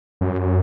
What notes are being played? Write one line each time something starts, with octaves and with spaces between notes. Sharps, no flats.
F#2